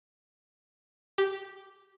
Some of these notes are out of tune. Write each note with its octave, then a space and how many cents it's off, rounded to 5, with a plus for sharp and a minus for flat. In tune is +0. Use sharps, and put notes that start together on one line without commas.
G4 -10